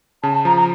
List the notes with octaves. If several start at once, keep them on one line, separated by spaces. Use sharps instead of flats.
C#3 A5
A5
F3 A#5
A#5